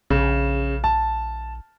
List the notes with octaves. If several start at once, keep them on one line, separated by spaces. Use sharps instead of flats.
A#1 C#3
A5